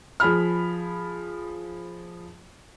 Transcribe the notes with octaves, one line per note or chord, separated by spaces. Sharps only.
F3 G#4 B5 F6